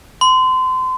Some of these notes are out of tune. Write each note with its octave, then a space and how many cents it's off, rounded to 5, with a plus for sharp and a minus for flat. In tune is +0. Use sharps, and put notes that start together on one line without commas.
C6 -30